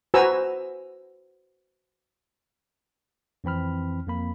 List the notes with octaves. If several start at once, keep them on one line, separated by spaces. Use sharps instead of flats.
F#4 B4 C5 G#5 A#5 E6
F2 E3 C4 B5 F6
F2 A#3 B5